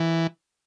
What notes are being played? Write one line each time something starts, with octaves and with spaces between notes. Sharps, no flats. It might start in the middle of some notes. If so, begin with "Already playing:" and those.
Already playing: E3